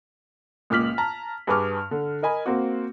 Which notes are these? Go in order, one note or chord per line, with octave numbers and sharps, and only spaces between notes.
C#2 A#2 D6 F6 B6 F#7
A5 A#5
G2 G#4 B4 C#6 D6 F6
D3
A#4 D#5 G#5 B5
A#3 C4 F#4